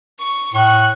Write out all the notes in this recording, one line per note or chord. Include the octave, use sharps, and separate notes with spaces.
C#6
A2 C#6 F#6